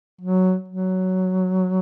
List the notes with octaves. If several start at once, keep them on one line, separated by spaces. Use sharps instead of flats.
F#3
F#3